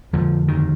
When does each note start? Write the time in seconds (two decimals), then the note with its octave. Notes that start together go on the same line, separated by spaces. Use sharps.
0.13 F2 D3 F3
0.48 D#3